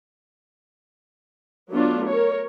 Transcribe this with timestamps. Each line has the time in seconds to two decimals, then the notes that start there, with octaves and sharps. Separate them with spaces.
1.70 F#3 A3 B3 D4 F4
2.09 A#4 C#5